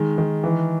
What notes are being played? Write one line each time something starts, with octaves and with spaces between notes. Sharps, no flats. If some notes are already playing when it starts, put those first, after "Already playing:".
Already playing: D#3 G#3
D#3
E3